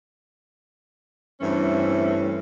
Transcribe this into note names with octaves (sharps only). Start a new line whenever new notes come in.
G2 E3 A3 C4 C#4